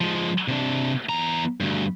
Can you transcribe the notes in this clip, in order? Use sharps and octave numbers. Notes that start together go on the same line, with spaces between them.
F3 G#3
C3 D4
E2 A#5
D2 G2